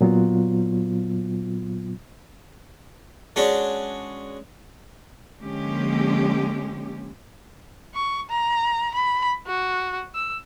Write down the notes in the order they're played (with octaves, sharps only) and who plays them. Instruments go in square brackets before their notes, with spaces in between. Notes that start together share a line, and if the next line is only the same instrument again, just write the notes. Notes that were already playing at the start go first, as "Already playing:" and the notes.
[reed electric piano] A#2 F#3 B3 F4
[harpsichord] G#3 C#4 D4 F#4
[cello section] D3 F3 G#3 A#3 C#4 G4
[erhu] C#6
A#5
B5
F#4
E6